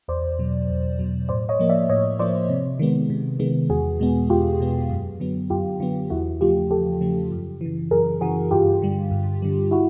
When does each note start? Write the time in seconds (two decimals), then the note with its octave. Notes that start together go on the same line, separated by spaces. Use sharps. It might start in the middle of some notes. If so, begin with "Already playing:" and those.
0.08 E2 C5 D5
0.39 B2 F#3
0.69 E2
0.99 B2 F#3
1.29 A2 C5 D5
1.49 C#5 D#5
1.59 F3 A#3
1.69 D5 E5
1.89 A2 C#5 D#5
2.19 F3 A#3 C5 D5
2.49 C3
2.79 D#3 G#3 B3
3.10 C3
3.39 D#3 G#3 B3
3.70 E2 F#4 G#4
4.00 B2 G#3 B3
4.30 E2 F4 G4
4.60 B2 G#3 B3
4.90 F#2
5.20 D3 F#3 B3
5.50 F#2 F4 G4
5.80 D3 F#3 B3 F4
6.10 E2 E4 F#4
6.41 C#3 F3 A3 F4 G4
6.71 E2 G4 A4
7.01 C#3 F3 A3
7.31 F#2
7.61 C#3 E3
7.91 F#2 G#4 A#4
8.21 C#3 E3 F#4 G#4
8.51 G2 F4 G4
8.82 D3 G3
9.11 G2
9.42 D3 G3
9.71 E4 F#4